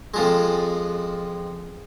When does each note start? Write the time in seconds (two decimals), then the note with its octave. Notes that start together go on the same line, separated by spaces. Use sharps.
0.14 F2 F3 G#3